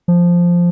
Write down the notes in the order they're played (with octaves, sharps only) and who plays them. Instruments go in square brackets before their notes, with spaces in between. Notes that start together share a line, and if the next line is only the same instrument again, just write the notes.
[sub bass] F3